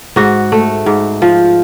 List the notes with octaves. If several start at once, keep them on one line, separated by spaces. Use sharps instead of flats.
G#2 F#4
A3
G#2
F3